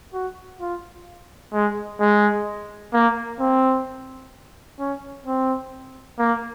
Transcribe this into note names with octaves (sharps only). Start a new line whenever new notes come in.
F#4
F4
G#3
G#3
A#3
C4
C#4
C4
A#3